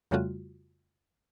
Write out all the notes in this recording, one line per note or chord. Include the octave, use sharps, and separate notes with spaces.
F2 C#3 G3 A3 F4 F#4